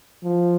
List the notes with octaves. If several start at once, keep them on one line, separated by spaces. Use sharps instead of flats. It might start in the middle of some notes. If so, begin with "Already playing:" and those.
F3